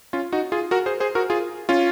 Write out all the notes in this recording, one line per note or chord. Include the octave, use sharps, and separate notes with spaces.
C#4 F4
D#4 F#4
F4 G#4
F#4 A#4
G#4 C5
G#4 C5
F#4 A#4
F4 G#4
C#4 F4